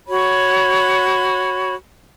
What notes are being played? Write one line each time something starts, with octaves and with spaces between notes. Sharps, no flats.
F#4 C#5 B5